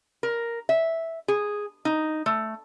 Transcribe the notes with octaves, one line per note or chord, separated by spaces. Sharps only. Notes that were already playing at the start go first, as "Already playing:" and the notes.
A#4
E5
G#4
D#4
A3